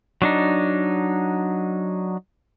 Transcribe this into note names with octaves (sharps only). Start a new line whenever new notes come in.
F#3 D4 D#4